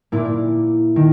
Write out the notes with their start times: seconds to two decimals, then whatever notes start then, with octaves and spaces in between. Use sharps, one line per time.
0.12 A#2 A#3 E4
0.96 D#3